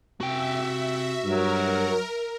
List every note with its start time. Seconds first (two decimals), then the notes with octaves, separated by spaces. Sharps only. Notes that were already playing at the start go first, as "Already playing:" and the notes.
0.21 C3 F#4 E5 G5
1.24 G2 F#3 A#4